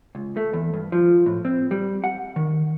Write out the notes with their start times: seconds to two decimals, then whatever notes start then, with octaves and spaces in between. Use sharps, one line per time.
0.15 C#2
0.37 A3
0.53 E2
0.74 G2
0.92 F3
1.26 A2
1.45 C4
1.71 G3
2.04 F#5
2.36 D#3